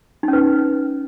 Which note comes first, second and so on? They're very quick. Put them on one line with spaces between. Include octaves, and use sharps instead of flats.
D#4 C#4 B4